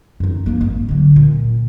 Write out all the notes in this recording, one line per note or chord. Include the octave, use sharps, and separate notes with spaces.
F#2 D#4
A#3 D4
G#1
D3 F#3
A#2